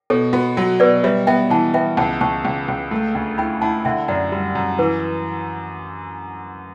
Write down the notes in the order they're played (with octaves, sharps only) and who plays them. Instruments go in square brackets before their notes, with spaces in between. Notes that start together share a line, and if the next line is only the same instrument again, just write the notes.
[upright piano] B2 [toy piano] A4 C#5
[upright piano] B3 [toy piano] F#4
[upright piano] F#3 [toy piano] F#4
[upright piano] B2 [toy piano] B4 D5
[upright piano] G3 [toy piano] C#5 E5
[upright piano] B3 [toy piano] E5 G5
[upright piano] E3 [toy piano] F#5 A5
[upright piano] B3 [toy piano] E5 G5
[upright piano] C#2 [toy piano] F#5 A5
[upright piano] C#2 [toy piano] A5 C#6
[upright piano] C#2
C#2
A3
D2
[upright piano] E4 [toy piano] G5 B5
[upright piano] E4 [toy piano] F#5 A5
[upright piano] D3 [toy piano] E5 G5
[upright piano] F#2 [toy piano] D5 F#5
[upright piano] G3
F#2
[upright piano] E3 [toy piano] B4